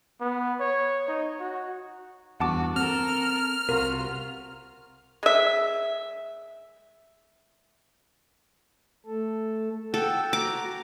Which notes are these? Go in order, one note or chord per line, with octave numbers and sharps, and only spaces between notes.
B3
C#5
D#4
F#4
E2 G2 F#4 F#5 A5 D6
C4 A4 A#4 F6
C2 C3 F4 F#4 A#4 A#5
G#3 E5
A3 A4
A4 F#5 G5 E6
F#4 A#5 D6